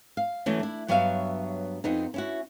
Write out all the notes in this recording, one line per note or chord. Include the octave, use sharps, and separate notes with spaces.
F5
E3 F#3 A3 B3 C#4
D4 E4
G2 F#3 B3 C#5 E5 F5
F2 B3 D#4
C#4 E4 F#4